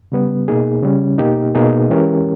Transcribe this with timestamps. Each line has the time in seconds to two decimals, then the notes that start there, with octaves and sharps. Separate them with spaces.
0.12 C#3 G3 B3
0.48 B2 A#3 D#4 G#4
0.83 C#3 G3 C#4
1.18 B2 A#3 D#4 G4
1.55 B2 A#3 D#4 G#4
1.90 E3 G#3 C#4 G4 A#4